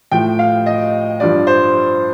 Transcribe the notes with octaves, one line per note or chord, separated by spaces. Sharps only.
A2 F3 G5
F5
D#5
G2 F3 D5
C5